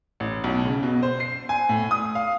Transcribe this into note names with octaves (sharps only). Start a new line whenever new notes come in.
A1
B1
C#3
B2
C5
C7
G#5
A2
D#6
F5